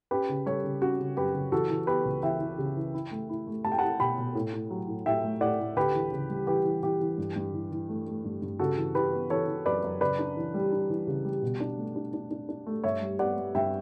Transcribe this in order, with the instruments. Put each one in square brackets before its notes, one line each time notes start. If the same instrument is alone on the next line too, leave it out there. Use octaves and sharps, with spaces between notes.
[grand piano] C#4 G4 B4
C#3
G3 A4 C#5
C#3
C#4 F#4
C#3
F#2 G4 B4
C#3
E3 F#4 A4
E3
B3 G4 B4
C#2
E3 E5 G5
E3
C#3
E3
E4
A3
E4
A3
A3 A5
G5
E4 F#5 A5
B2 G5 B5
B2
A2
A2
F#3
A2
A2 E5 G5
A3
A2 D5 F#5
A2
D2 G4 B4
E3
C#3
G3
E3 G4 B4
E3
E3 G4
E3
G2
G2
E3
E3
A3
A3
G2
G2
C#3 F#4 A4
E3
E3 G4 B4
B3
E3 A4 C#5
E3
F#2 B4 D5
F#2
C#3 B4 D5
D4
E3
G3
D4
E3
C#3
G3
B2
D4
A3
D4
D4
D4
D4
A3
G2 C#5 E5
G3
B3 D5 F#5
G3
G2 E5 G5